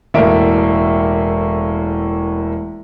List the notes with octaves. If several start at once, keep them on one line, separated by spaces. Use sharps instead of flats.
E1 A2 A#3 E5 D7